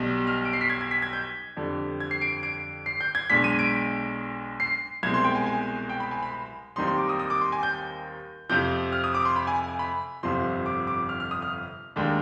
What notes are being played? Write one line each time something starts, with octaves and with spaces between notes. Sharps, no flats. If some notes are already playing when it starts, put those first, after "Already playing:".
Already playing: B1 B2 G3
F6
D7
C7
B6
G#6
G#6
B6
G#6
G6
F2 D3 G3
G#6
C7
D7
D7
C7
G6
G#6
B1 B2 G#3 D4 B6
D#7
D7
C7
C2 B2 G#3 C4 G#6
C6
G5
G#5
G#5
G5
B5
G#5
B5
D#2 D#3 G3 C4 D#4 C6
C6
D6
D#6
D#6
D6
C6
G#5
G6
F2 C3 F3 G6
F6
D#6
D6
C6
B5
G#5
G#5
B5
G1 F2 C3 F3 C6
D6
D6
F6
F6
D#6
F6
D#2 D#3 G#3 D4